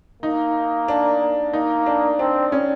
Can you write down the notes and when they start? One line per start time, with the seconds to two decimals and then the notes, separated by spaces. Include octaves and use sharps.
0.23 A#3 D#4
0.88 D4
1.53 A#3 D#4
1.86 D4
2.19 C4 D4
2.52 C#4